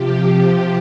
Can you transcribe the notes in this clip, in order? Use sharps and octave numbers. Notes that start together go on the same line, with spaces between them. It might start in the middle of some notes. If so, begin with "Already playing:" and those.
Already playing: C3 F3 G4